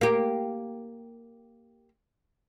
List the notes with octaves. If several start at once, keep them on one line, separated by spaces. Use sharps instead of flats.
A#3 G4